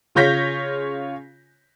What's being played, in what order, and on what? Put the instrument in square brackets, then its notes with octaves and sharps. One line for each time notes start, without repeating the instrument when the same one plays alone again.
[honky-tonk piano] C#3 F4 C#5 G6 A#6 B6